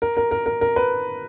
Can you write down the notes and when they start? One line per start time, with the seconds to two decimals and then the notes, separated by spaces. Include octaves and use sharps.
0.02 A#4
0.17 A#4
0.31 A#4
0.46 A#4
0.61 A#4
0.76 B4